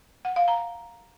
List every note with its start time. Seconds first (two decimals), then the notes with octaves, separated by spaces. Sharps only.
0.25 F#5
0.36 F5
0.48 A#5